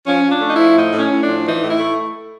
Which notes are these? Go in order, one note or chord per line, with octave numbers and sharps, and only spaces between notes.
F3 C#4
F3
D4
A3
D#4
E4
F3
A2 D#4
A2
C#4
A2
D4
F3
E3 D#4
A2
E4
A3